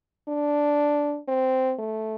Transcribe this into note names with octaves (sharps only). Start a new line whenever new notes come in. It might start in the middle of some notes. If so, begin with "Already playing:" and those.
D4
C4
A3